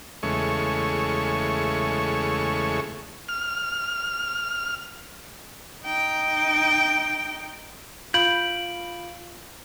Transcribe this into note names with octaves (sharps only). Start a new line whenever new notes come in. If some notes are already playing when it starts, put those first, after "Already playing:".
E2 C#3 G#3 A3 C#6
F6
D#4 G5
F4 F5 B5 G6 D7 F#7